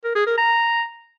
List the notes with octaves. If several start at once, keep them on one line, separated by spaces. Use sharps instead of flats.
A#4
G#4
A#4
A#5